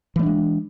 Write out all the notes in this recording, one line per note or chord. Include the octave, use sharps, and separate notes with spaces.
E3 G#3 A3 D4